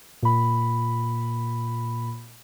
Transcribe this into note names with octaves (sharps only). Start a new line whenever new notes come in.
A#2 B5